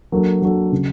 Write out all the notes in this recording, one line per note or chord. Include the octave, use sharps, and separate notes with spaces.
F#3 A#3 D4 F#4 A4
F#3 A#3 D4 F#4 A4
C#3 F#3